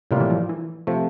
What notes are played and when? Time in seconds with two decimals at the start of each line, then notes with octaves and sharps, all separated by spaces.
0.11 A2 C3 G3 A#3 F4
0.20 E3
0.30 F3
0.49 E3
0.87 C3 F3 A3